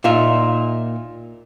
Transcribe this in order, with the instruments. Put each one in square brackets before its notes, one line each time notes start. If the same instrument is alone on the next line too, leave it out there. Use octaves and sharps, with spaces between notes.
[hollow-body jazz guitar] A#2 D#4 F4 E5